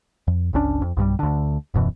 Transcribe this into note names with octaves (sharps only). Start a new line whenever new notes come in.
F2
G1 C#2 C#4 D4
F2
B1 G2 F#3 G3
D2 D3
D#1 F#2 B2 E3